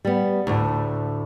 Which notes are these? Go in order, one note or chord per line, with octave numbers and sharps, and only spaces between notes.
G3 B3
D2 A2